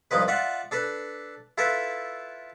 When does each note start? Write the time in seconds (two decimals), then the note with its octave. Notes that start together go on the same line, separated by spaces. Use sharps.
0.11 C2 G2 F3 D#4 B4
0.28 F4 D5 E5 F#5
0.71 D4 A4 B4
1.58 E4 F4 A4 B4 E5